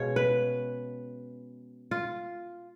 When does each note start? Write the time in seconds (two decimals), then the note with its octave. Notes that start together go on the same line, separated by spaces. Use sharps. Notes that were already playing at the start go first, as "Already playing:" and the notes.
Already playing: B2 G#3 C#4 C#5 F5
0.16 B4
1.91 F4